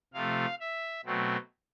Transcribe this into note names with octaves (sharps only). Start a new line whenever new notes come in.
C3 F3 A3 F5
E5
B2 F#3 A3 C4